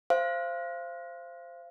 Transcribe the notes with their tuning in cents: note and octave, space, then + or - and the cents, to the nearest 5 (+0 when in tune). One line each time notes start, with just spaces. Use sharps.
C5 +0 F5 -25